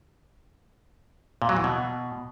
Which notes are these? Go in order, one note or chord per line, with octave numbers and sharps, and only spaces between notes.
A#2
F#3
E3
B2